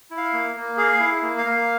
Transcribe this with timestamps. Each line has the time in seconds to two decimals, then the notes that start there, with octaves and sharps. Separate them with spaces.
0.11 E4
0.18 F5
0.33 A#3
0.56 A#3
0.77 G#4 F5
1.00 E4
1.23 A#3
1.38 F5
1.46 A#3